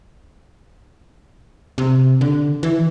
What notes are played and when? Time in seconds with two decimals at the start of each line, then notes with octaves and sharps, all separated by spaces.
1.78 C3
2.21 D3
2.63 E3